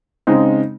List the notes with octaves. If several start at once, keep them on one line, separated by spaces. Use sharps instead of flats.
C#3 G#3 C4 D#4